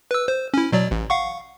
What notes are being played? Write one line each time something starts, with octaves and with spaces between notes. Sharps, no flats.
B4 E6
C5
C#4 E4
B2 F#3 D5
A1
F5 F#5 C#6